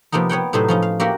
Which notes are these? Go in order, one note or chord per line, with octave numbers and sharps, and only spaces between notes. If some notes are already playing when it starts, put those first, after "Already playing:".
C3 F3 A#3 B3 D#4
B3 C#5 F#5 G5
A2 C3 F#3 D#4 B4 C5
F3 C#4 D#4
F5
A#3 F#4 G4 A#4 E5 F#5